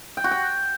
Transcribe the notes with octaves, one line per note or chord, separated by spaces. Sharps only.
G5
F#4
G5